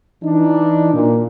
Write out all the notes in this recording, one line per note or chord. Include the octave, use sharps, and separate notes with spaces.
E3 D4 D#4
A#2